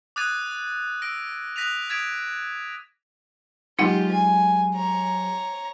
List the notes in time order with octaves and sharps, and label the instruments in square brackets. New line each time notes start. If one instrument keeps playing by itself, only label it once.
[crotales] D6 D#6 F#6 G#6 A6 D#7
E6 A#6 D7
D#6 F#6 A#6 B6 D#7 F7
D#6 G#6 A6 B6 D7 E7
[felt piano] F#3 G#3 [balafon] D#4 F#5 [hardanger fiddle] F4 G4
[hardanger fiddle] G#5
C#5 A#5